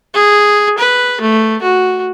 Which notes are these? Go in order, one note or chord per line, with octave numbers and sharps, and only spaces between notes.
G#4
B4
A3
F#4